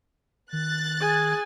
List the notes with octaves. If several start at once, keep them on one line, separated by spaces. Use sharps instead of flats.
D#3 F#6 A6
G#4 G#5